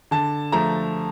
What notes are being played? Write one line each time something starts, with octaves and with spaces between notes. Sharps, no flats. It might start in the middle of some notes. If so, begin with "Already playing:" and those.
D3 A5
F3 A3 A#5